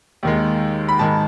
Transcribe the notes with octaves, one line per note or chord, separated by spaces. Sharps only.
D#2 D#3 G#3
B5
G#2 D#3 G#3 A5